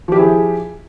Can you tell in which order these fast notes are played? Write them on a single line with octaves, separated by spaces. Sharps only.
F3 G4 E4 G#4